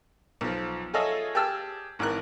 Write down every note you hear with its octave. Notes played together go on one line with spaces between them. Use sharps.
B1 F3
F4 G#4 A4 C#5 D#5 E5
G4 G#4 A5 E6 F6
G#1 E3 A#4 F#6